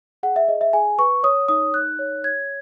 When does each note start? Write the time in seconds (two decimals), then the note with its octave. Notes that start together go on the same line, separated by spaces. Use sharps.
0.23 G#4 F#5
0.36 E5
0.48 G#4 D#5
0.61 E5
0.73 G#4 G#5
0.99 B4 C#6
1.23 C#5 D#6
1.48 D#4 D#6
1.74 D#4 F#6
1.99 C#5
2.24 C#5 G#6